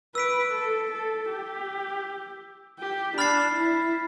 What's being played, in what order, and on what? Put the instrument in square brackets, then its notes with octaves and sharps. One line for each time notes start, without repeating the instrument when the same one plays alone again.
[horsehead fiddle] B4 [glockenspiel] E6 B6 D7
[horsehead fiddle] A4
A4
G4
G4
[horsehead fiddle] D4 [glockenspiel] B5 F6 A6 C7
[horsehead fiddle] E4